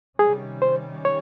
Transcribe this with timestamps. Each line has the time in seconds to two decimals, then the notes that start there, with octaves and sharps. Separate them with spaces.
0.19 C3 D#3 G3 C#4 G#4
0.62 C5
1.05 C#5